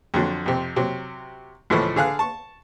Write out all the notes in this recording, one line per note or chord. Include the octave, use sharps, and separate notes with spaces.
F2 D3 F#3
F2 C3
C3 F#3
C#2 A2 E3 F3 A3
D3 G#4 F5 F#6
A5 C#6